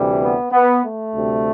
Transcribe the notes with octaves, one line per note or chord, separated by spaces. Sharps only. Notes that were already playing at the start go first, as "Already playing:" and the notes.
Already playing: D2 C3 E3 G3
B3
B3
A3
D2 C3 G3